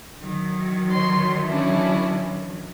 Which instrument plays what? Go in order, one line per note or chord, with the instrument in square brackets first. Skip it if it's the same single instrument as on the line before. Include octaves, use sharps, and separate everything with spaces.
[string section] D#3 E3 F#3
[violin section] C#5 C6
C#4 D4 E4